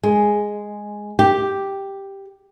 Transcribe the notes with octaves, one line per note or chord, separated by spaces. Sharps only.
G#3
G4